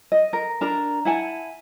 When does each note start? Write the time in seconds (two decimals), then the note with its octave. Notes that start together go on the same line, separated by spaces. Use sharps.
0.12 D#5
0.33 A#4
0.61 D4 A#4 A#5
1.05 E4 F#5 G#5 A5